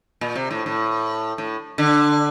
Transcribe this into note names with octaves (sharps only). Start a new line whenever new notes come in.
A#2
C3
A2
A2
A2
D3